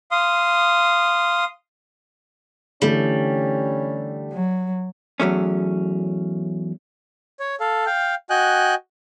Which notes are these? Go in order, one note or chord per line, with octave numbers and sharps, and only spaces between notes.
F5 C6 D#6
D3 E3 G3 A3 C#4
F#3
E2 F#3 A3 C#4
C#5
A4 F5
F5 G5
F#4 D#5 G5 G#5 F#6